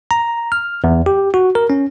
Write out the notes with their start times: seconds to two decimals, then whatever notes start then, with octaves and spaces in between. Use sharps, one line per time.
0.11 A#5
0.52 F6
0.84 E2
1.06 G4
1.34 F#4
1.55 A#4
1.70 C#4